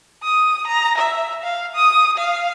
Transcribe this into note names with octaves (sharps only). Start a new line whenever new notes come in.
D#6
A#5
E5
F5
D#6
F5